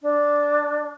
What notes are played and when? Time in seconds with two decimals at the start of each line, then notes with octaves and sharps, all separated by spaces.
0.02 D4